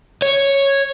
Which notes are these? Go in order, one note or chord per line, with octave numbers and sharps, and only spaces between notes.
C#5